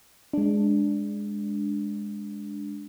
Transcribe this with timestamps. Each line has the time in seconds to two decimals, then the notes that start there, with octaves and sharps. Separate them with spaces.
0.33 G#3 D4